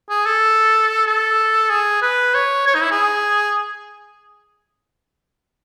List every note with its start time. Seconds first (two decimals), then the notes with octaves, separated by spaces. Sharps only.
0.10 G#4
0.26 A4
1.06 A4
1.70 G#4
2.02 B4
2.35 C#5
2.67 C#5
2.75 D#4
2.82 E4
2.91 G#4